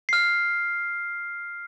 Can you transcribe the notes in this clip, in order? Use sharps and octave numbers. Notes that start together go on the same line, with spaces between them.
F6 C7